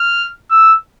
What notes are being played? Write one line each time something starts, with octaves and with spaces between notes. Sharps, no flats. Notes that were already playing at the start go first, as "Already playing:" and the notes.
Already playing: F6
E6